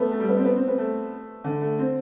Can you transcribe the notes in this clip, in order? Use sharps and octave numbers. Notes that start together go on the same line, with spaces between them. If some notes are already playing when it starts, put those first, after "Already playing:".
Already playing: A3 B3
A3
G3
B3
C4
B3
C4
B3
A3
D3
A3
C4